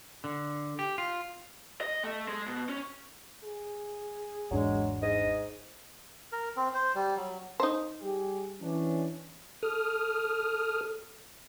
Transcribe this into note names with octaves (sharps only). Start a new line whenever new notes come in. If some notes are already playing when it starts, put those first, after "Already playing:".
D3
G4
F4
D#5
A3
G#3
B2
C#4
G#4
G#1 E2 F#3 G#3 D4
G#2 D#5
A#4
C4
C5
G3
F#3
D#4 C5
G3 G4 G#4
E3 C#4 D4
A4 D#6 F6